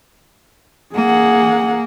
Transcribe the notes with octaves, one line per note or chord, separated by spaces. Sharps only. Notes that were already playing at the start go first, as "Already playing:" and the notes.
A#3 G#4 F#5